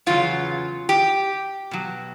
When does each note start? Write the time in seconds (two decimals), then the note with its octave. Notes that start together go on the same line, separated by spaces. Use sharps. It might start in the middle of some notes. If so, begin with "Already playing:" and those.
0.06 E2 C#3 F#3 F4
0.89 G4
1.71 B2 F#3